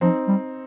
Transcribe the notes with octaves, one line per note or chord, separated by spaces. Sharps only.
F3 C4 D#4
G3